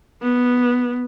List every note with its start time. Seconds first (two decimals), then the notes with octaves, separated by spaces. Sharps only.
0.22 B3